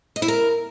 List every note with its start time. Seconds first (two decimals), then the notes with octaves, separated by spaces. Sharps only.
0.16 D#5
0.22 E4
0.28 A#4